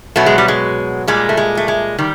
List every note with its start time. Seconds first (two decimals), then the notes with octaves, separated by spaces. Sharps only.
0.16 B2 F#3 A3
0.26 G#3
0.38 G3
0.48 G#3
1.08 A#2 G3 G#3
1.29 A3
1.37 G#3
1.57 A3
1.68 G#3
1.98 D#3 G3